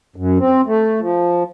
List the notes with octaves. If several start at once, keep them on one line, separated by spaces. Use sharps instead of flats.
F#2
C4
A3
F3